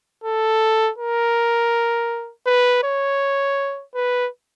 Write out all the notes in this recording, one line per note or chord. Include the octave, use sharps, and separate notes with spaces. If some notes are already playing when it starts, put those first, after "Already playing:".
A4
A#4
B4
C#5
B4